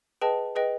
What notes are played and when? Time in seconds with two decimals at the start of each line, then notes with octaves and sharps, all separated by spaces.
0.21 G#4 B4 D#5 G5 A5
0.56 G#4 B4 D#5 G5